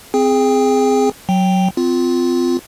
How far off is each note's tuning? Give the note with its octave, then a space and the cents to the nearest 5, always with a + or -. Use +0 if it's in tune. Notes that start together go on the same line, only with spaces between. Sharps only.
C4 -15 G#4 +0 G5 +30
F#3 +0 G5 +0
C4 -30 F4 +0